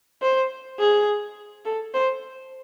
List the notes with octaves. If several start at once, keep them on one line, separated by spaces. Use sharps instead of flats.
C5
G#4
A4
C5